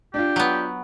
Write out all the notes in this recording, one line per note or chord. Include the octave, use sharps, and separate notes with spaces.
D4 F4 G4
F#3 B3